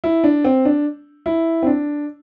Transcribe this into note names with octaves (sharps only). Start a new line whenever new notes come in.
E4
D4
C4
D4
E4
C4
D4